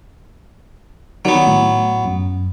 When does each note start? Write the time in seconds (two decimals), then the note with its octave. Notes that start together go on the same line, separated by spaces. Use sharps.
1.25 D#3 F#3 B3 D5 C#6
1.47 A2
2.05 F#2